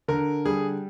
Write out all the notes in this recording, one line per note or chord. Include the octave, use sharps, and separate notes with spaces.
D3 A#4
G3 G#4